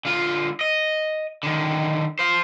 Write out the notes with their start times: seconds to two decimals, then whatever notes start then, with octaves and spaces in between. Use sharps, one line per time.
0.05 D3 F4
0.61 D#5
1.43 D3 D#3
2.19 C5 F5